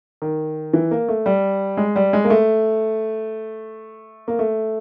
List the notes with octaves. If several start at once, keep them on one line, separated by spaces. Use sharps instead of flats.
D#3
E3
A#3
A3
G3
G#3
G3
G#3
A#3
A3
A#3
A3